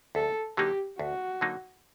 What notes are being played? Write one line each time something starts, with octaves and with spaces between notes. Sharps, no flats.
D2 A4
D3 F#3 A#3 D#4 G4
D2 F#4
D3 F#3 A#3 D#4